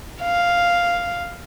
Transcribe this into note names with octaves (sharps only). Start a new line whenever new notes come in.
F5